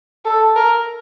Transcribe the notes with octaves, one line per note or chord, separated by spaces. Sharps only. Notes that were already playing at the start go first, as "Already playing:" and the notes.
A4
A#4